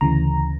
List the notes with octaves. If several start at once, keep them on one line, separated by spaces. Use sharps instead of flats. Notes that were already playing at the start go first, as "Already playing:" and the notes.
D2 C#3 E3 A#5